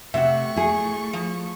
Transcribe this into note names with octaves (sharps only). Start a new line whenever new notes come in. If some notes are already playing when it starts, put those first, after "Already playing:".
C3 A3 E5 F#5 C#6
E4 G#4
F3